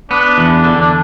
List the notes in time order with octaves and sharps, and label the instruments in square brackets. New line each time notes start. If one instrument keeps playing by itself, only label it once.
[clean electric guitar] B3 [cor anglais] D4
[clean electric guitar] E2
D3
[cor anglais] D4